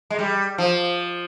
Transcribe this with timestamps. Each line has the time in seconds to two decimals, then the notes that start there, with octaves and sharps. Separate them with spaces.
0.10 G#3
0.19 G3
0.58 F3